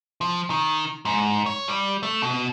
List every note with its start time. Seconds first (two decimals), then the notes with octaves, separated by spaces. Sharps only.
0.21 F3
0.50 D#3
1.05 G#2
1.46 C#5
1.68 G3
2.03 A3
2.22 B2